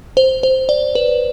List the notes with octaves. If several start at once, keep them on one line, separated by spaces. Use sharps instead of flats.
C5
C5
D5
B4